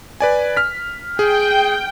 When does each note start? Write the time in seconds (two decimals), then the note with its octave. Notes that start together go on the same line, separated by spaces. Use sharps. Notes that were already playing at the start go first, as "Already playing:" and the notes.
0.20 B4 D5 G#5
0.56 F6 B6
1.19 G#4 G5